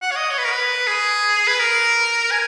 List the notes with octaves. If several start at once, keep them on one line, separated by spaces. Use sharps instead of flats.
F#5
C#5
D#5
C#5
B4
A#4
B4
G#4
B4
A#4
G#5